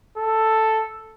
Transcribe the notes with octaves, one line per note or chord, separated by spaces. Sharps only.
A4